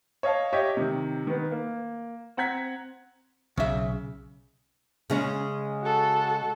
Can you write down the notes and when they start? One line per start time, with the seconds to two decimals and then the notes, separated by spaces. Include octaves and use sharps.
0.23 C#5 D#5 F5 A5
0.53 G4 C#5 D#5 E5
0.77 C3 D#3
1.27 D#3 B3
1.51 A#3
2.37 C4 F#5 A#5 G#6 B6
3.57 B1 C#3 E5
5.10 C#3 G#3 C#4
5.82 F#4 A4